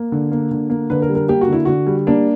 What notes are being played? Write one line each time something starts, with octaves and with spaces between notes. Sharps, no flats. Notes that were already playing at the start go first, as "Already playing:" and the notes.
Already playing: A#3
D3
A#3
D3
A#3
D3 B4
A#4
G3
A#4
A#3 G4
F#4
D3 E4
D3 F#4
G3
A#3 D4